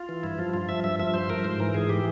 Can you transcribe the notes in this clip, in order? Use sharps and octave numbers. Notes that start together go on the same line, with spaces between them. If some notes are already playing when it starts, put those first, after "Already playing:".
Already playing: F4
E3
G2 E4
F3 F4
G2 F4
F3 E5
G2 E5
F3 E5
G2 C5
F3 A#4
G#2 C5
E3 A#4
G#2 G#4
E3 G4